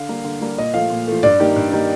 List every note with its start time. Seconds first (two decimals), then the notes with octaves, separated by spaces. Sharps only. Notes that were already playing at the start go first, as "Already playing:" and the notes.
Already playing: D3 F5
0.09 G3 A#3
0.24 D3
0.41 G3 A#3
0.58 A#2 D#5
0.74 F3 A3 F5
0.90 A#2
1.08 F3 A3
1.23 G2 D5
1.40 D#3 A#3 D#4 G4
1.56 G2
1.72 D#3 A#3 D#4 G4